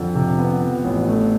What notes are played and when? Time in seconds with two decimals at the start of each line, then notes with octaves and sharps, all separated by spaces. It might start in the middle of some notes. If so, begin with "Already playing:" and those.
Already playing: F2 D3
0.15 C3
0.38 B3
0.62 F3
0.84 A1
1.08 A3